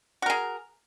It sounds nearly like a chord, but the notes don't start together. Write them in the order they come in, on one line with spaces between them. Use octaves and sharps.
F#4 A#4 G#4